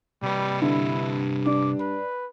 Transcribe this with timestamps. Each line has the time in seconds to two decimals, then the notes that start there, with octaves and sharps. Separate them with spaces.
0.23 C3 G3 B4
0.62 G2 D3 E4
1.46 D4 D6
1.80 B4